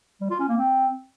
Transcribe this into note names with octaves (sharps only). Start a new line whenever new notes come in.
G3
F4
C#4
A#3
C4